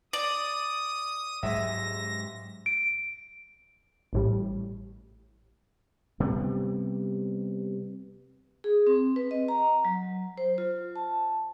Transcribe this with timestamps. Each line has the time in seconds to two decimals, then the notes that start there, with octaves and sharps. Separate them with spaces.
0.13 D5 D#6
1.43 G#2 F#3 G#3 E5 A#6
2.66 D7
4.13 A1 A2 G3
6.20 C3 G3 B3
8.64 G#4
8.87 C4
9.16 B4
9.31 D#5
9.48 A#5
9.85 F#3
10.38 C5
10.58 F4
10.96 A5